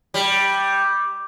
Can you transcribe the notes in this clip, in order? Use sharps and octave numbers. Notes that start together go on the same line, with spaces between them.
G3